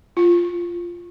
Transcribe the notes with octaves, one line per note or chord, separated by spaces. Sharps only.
F4